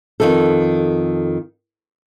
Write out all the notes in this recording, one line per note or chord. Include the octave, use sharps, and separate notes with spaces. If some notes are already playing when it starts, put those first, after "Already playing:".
F2 D#3 A4